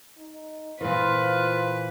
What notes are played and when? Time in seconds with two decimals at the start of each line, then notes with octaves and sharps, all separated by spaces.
0.18 D#4
0.81 A#2 E3 F4 B4 C5